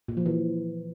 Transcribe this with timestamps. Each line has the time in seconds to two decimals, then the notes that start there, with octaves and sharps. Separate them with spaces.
0.08 A#2
0.17 F3
0.26 E3